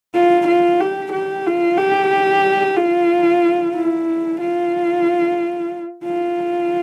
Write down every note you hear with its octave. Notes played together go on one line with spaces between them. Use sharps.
F4
F4
G4
G4
F4
G4
F4
E4
F4
F4